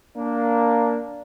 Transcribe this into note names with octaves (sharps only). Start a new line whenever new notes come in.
A#3 D4